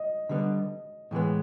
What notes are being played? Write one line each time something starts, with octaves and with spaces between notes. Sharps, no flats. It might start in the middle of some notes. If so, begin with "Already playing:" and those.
Already playing: D#5
D3 G3 B3
A2 E3 G#3 B3